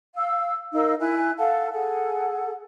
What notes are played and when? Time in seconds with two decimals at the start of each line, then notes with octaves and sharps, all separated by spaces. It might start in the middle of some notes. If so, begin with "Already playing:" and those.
0.16 F5 E6
0.73 D#4 A#4 F5 E6
1.00 E4 G#5 F#6
1.38 A4 F5 F#5 A5
1.73 G#4 A4 F#5